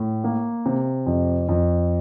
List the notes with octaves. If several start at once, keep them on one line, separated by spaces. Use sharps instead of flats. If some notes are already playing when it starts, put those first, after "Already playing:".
Already playing: A2
A#3
C3
F2
F2